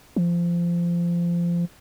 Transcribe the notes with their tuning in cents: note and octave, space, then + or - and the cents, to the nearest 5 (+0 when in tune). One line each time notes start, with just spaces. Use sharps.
F3 -20